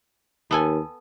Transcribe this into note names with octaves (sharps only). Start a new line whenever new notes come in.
D#2 B3 A4 G#5